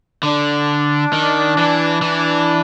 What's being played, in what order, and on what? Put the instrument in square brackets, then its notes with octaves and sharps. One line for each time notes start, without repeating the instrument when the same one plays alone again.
[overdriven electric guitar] D3 [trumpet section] D4
[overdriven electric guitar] D#3
E3
[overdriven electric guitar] E3 [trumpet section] D4